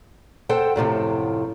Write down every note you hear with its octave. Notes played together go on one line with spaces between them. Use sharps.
A4 C5 F#5 G5
F#2 A2 C3 F3